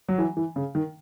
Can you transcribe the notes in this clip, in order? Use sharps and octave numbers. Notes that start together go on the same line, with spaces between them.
F#3
E3
E3
C#3
D#3